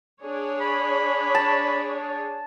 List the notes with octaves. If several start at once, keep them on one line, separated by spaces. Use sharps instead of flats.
D4 G#4 C#5
B5
A5